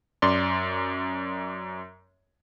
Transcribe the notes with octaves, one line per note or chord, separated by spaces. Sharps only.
F#2 D5 C6